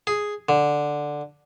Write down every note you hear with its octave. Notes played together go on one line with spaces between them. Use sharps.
G#4
D3